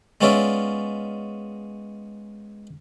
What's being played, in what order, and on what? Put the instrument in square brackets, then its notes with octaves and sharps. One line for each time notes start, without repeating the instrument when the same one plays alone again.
[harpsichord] G#3 B3 C#4 F4 D5 E5